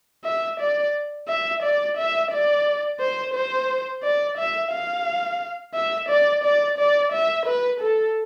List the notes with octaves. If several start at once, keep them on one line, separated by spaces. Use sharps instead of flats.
E5
D5
E5
D5
E5
D5
C5
C5
D5
E5
F5
E5
D5
D5
D5
E5
B4
A4